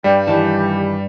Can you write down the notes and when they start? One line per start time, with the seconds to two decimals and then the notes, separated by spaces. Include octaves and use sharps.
0.04 G2 G3 G5
0.27 D#3 E3 G4 A5